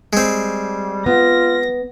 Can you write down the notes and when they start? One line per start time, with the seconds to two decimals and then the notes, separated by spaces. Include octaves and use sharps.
0.13 G3 G#3 C4
1.06 B3 F4 A#6